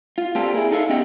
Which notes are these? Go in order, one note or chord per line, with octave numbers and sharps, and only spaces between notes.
F4
A#3 C4 D4 F4 G4 A4
E4 G#4 A#4
D#4 A4 E5 F5
B3 C#4 G4 D#5 F#5 G5